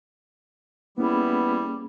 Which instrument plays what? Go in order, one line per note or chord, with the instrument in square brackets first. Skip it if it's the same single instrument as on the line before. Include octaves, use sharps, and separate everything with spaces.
[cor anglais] G3 [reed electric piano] A#3 C#4 G#4 [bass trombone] B3 [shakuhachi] E4